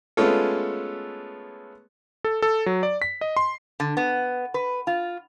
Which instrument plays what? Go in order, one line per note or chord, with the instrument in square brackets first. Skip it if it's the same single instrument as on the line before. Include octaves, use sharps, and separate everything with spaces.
[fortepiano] G#3 A3 B3 C#4 F4 A4
[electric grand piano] A4
A4
F#3
D5
B6
D#5
C6
[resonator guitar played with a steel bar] D3
B3
B4
F4